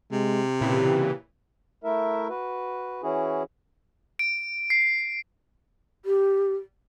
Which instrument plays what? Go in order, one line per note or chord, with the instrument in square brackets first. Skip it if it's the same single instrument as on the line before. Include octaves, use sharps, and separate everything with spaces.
[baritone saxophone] C3 [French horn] G#3
[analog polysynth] A#2 C#3 E3 [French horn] G4
[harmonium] A3 E4 A#4 E5
F#4 B4
E3 C#4 E4 F#4 G#4
[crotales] D7
C7
[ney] G4